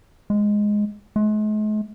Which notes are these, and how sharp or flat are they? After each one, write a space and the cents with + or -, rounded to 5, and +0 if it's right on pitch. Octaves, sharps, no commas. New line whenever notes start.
G#3 +0
G#3 +45